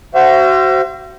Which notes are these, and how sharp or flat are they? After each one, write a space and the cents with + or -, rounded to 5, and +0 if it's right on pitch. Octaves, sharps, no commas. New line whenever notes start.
F#4 +25 C5 +0 E5 +45